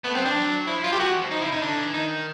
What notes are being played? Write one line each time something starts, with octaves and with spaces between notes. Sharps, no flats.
A3 B3
F#3 C4
F3 D4
F#3
F3 E4
F#3 F4
A3 G4
G#3 F#4
E3
F3
F3 D#4
C#3 E4
C#3 D#4
D3 D4
E3
D#3 D#4